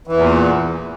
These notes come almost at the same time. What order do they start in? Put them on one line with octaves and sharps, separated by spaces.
E3 E2 A#2